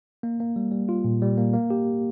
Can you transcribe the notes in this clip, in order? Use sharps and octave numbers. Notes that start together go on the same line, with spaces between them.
A#3
A#3
G3
G3
F4
A#2
G3
A#3
A#3
G4